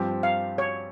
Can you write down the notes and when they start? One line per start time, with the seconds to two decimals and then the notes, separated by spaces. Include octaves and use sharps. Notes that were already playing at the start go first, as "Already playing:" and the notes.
Already playing: G2 F3 C4 G4
0.23 F5
0.58 C#5